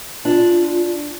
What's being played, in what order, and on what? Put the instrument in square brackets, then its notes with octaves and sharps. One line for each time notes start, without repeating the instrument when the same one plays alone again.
[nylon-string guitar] D4 [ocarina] F4